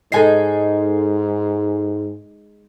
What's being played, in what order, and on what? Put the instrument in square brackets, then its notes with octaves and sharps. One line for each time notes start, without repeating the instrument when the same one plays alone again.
[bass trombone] G#2 [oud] G#3 D#4 D#5 [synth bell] A4 G#5 C7